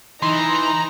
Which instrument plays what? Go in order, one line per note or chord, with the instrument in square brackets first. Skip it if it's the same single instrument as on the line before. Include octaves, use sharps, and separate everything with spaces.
[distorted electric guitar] E3 [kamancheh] D#4 [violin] A#5 [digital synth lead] C6